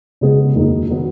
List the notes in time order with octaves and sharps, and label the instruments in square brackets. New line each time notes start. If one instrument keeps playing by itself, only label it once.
[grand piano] C#3 G#3 B3 G#4
D#2 D#3 F#3 D#4
D#3 F#3 B3